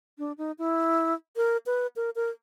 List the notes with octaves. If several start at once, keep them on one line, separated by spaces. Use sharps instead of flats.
D4
D#4
E4
A#4
B4
A#4
A#4